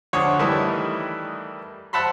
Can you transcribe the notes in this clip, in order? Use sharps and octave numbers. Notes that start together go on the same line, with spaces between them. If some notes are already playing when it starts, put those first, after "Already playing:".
D2 D3 C5 C#5 D#6
D#3 E3 G3 A3 D#4 E4
C5 E5 F#5 A5 B5 C6